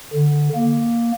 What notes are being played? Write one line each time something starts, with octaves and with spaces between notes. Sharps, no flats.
D3
A#3